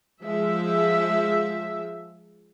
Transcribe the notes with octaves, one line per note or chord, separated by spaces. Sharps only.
F3 G#3 E5